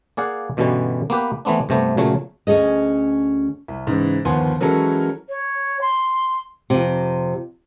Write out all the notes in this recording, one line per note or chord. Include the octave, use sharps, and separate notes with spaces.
A#3 G#4 D5 F5 F#5
G2 B2 D3 E3 G3 C#4
A#3 B3 G4 B4
E3 A3 B3 C4 D4
G2 C3 A3 B3
A#2 C#3 F#3 A3
D2 C#4 G#4 D#5
C2
G#2 C#3 E3
G1 D#2 F3 B3 G#5 C6
E3 F#3 G#3 C#4 A4 A#4
C#5
C6
F2 C3